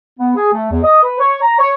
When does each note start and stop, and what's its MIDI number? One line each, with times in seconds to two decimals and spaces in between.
0.19 0.31 59
0.36 0.51 68
0.52 0.68 57
0.70 0.78 40
0.83 1.00 75
1.03 1.19 71
1.19 1.41 73
1.42 1.58 82
1.59 1.71 73